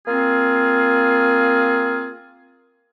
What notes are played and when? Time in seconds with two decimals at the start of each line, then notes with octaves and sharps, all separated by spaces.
0.07 A#3 C4 F4 G#4